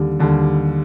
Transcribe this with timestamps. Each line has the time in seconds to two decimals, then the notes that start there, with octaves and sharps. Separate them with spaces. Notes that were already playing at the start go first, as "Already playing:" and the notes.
Already playing: D#2 D3 G3
0.19 D#2 D3 G3